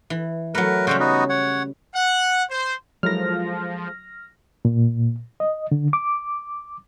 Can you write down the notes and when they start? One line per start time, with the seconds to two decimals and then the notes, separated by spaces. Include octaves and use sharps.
0.10 E3
0.55 F#3 A3 A#4 B4
0.87 C#3 G3 C#4 F#4 C5
1.00 B3 D#4 F#4
1.29 C#5 F#5
1.95 F#5
2.50 C5
3.03 F3 F#3 G#3 E4 A4 A#4 F6 A#6
4.65 A#2
5.40 D#5
5.72 D3
5.93 D6